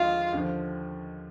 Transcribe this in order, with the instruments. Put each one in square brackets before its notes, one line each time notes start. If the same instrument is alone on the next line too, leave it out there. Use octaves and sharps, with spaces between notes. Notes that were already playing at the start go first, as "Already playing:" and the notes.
Already playing: [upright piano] D#2 D3 F3 G#3 D#4 [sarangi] F4
[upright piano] D#2 D3 F3